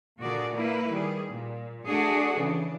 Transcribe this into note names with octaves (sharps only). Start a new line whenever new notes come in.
A#2 D3 F#4 G#4 A#4 D5
A#3 E4 A#4 B4
D#3 G3 G#4
A#2
A3 D4 F#4 G#4 A4
C#3 E3 D4